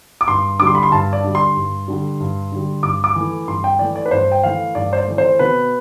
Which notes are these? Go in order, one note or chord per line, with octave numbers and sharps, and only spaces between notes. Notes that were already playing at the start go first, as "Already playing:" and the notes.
D6
G2 C6
D3 G3 D6
C6
B5
C6
G2 A5
D5
D3 G3
C6
G2
D3 G3
G2
D3 G3
G2 D6
D6
E3 A3
G2 C6
G5
E3 A3 D5
D5
B4
G2 C5
G5
E3 A3 F5
G2 D5
C5
D5
E3 A3
C5
B2 B4